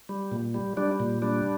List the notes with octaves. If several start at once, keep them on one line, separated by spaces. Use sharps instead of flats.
G3
A#2
G3
G3 D4
A#2
G3 D4